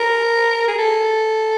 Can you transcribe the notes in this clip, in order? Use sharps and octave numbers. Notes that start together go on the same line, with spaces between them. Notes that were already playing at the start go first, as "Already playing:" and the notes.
Already playing: A#4
G#4
A4